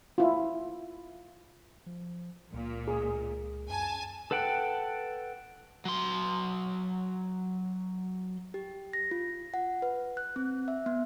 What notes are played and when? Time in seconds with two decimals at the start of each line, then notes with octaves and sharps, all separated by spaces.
0.18 E4 F4
1.86 F3
2.54 C#2 A#2
2.88 G#4
3.69 F#2 G#5 A5
4.31 A4 B4 F#5 G5
5.85 F#3 C6
8.54 G4
8.93 A#6
9.11 F4
9.54 F#5
9.82 B4
10.17 F#6
10.36 C4
10.68 E5
10.86 B3